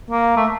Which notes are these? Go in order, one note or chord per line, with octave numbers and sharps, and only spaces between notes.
A#3
A3